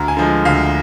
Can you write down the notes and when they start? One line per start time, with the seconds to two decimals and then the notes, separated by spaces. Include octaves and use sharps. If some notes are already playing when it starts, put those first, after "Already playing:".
Already playing: D2 A#5
0.08 G#5
0.17 D3 F3 G#3
0.45 D2 F5